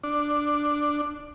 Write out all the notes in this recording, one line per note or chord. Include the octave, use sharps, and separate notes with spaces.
D4